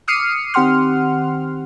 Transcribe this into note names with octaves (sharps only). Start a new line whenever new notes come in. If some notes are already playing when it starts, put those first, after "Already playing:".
D6 D#6 F6 C7 C#7 D#7
D#3 C4 G4 F#5 C6 F6